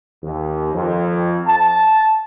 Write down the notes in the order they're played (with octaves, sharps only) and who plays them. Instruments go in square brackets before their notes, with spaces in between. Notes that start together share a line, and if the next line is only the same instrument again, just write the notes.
[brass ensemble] D#2
F2
A5